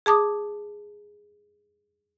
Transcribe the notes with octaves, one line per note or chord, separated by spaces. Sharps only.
G#4 A5 D6 D#6